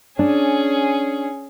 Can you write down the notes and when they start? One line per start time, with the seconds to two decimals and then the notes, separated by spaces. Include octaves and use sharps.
0.19 C#4 D4 G#4